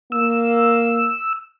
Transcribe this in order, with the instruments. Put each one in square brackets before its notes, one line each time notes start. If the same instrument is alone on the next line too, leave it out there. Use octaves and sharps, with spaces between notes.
[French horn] A#3 [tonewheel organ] E6